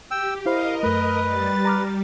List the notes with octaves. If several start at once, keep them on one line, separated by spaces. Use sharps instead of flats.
G4 G5 E6
E4 A#4 C5 D#5 F5 B5
F#2 A3 B4
G3 A6
G3 A#5 D6 F6